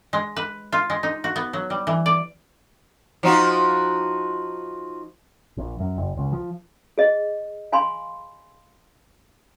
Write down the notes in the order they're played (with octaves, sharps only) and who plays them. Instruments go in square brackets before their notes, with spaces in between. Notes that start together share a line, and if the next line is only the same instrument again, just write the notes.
[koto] G#3
B4
F4
G#3
D#4
F#4
B3
F#3
G3
E3
D5
[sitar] F3 D#4 F#4
[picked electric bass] A#1
F#2
F#1
C#2
F3
[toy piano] G#4 D#5
F5 G#5 B5 C6